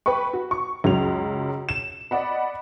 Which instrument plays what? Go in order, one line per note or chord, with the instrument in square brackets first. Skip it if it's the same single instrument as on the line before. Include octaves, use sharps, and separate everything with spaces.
[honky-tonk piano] B4 G5 B5 C#6
F#4
C#6
C#2 F#2 F#3 F7
E7
D5 D#5 F#5 B5